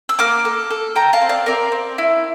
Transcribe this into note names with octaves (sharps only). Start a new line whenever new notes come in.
E6
A#3 D6 F6
A4
A4
A4 G5 A#5
F5 A5
C4
D5 F5
C4 A#4 D5
C4
E4